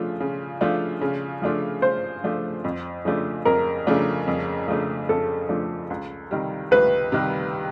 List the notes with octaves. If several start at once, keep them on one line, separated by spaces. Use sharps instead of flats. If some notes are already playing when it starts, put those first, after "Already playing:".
Already playing: C#3 F3 A3 D4 F4
C#3
F3 A3 D4 F4
C#3
F3 A3 D4 F4
C#3 C5
F3 A3 D4 F4
F2
C#3 F3 A3 D4
F2 A#4
C#3 F3 A3 D4
F2
C#3 F3 A3 D4
F2 A4
C#3 F3 A3 D4
C#2
C3 D#3 G3
C#2 B4
C3 D#3 G3